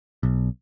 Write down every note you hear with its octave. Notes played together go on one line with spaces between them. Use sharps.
B1